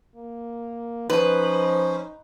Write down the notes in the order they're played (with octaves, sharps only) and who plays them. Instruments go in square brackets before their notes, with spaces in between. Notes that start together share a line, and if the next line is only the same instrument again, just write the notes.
[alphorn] A#3
[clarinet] F3 [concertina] C#4 C5 [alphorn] D#4 [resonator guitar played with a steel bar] B4